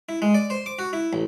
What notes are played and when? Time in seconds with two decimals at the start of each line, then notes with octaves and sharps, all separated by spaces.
0.09 E4
0.22 G#3
0.34 D5
0.50 C5
0.66 D6
0.79 F#4
0.93 E4
1.13 A1